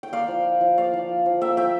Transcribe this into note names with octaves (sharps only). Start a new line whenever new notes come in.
G5
A#3 D5 F5
F3
F4
F3
A#3 D5 F5
F3
F4
F3
A#3 E5 G5
F3 E5 G5